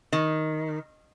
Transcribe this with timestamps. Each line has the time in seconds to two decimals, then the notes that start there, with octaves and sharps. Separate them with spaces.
0.13 D#3